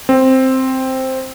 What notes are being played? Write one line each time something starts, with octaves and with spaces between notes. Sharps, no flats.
C4